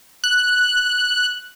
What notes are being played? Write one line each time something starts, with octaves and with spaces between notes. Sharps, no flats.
F#6